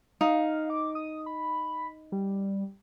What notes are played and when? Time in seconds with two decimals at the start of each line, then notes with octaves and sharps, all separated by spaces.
0.21 D#4 F5
0.70 D6
0.95 D#6
1.26 B5
2.12 G3